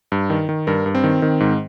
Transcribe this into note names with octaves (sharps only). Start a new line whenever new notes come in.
G2
D#3
D#3
G2 A#4
G2
C4
D#3
D#3
G#2